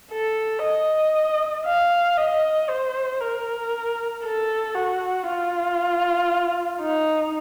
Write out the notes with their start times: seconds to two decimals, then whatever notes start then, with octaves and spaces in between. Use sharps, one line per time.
0.11 A4
0.63 D#5
1.66 F5
2.17 D#5
2.69 C5
3.21 A#4
4.24 A4
4.75 F#4
5.27 F4
6.81 D#4